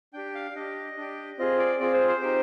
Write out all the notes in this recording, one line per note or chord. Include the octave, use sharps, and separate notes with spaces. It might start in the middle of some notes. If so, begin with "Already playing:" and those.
D4 G4 G5
F5
D4 G4 D#5
D4 G4
C4 F4 G#4 D#5
D5
C4 F4 G#4 D5
C5
C5
C4 D#4 G4